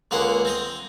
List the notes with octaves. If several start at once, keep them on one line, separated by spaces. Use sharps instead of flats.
C#2 D3 A#3 G#4 F#5
C4 A#5 D#6